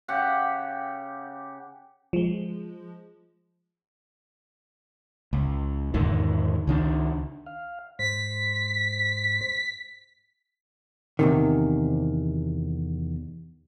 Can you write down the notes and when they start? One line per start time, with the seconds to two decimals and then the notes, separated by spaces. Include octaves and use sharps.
0.08 C#3 G4 F#5
2.13 F3 G#3
5.33 C#2
5.94 E2 G#2 D3 D#3
6.67 C#2 D#3 D4
7.46 F5
7.99 G#2 C5 B6
11.19 E2 C3 D#3